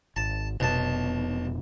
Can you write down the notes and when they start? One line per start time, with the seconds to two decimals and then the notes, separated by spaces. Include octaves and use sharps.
0.16 G#1 A5
0.60 F1 B1 B2 A5